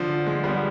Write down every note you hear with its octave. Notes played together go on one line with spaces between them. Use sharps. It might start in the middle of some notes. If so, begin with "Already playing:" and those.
Already playing: D3 F3
F3 G#3
G3 B3